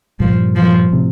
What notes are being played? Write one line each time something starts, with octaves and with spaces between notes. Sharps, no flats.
G2 A#2 F3
F3
A2 C3